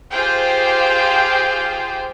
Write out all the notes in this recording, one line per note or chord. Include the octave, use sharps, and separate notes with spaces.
F4 G4 G#4 C5 F5 G5